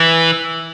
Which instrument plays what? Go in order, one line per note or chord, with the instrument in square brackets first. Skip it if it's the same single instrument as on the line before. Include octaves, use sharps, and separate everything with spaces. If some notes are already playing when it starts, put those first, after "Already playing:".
Already playing: [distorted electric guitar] E3